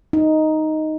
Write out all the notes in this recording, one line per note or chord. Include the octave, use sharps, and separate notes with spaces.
D#4